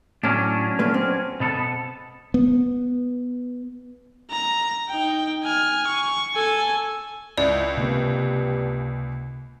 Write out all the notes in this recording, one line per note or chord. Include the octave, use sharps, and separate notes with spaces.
A2 F#3 C#4 D4
A#2 A3 B4
C4
B2 B3 A4
B3
A#5
D#4 G5
G#5 F6
C#6
A4 G#5
C#2 E4 D5 E5
G2 C3 A#3 C4